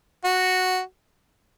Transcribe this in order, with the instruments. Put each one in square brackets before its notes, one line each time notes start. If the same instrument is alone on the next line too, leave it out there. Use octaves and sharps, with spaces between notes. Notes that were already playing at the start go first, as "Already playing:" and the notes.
[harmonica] F#4